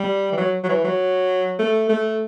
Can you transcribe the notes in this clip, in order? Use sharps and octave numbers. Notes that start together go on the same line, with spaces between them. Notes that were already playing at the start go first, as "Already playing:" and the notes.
Already playing: G3
E3
F#3
F#3
E3
F#3
A3
A3